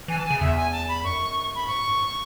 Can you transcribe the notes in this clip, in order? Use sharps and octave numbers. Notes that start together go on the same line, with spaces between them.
E3 G#5
A5
C#3 G#5
E2 E5
G#5
A5
B5
F#2 C#6
B5
G#2 C#6
F#2
G#2